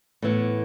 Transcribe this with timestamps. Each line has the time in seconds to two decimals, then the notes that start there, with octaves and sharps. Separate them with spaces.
0.22 A2 E3 B3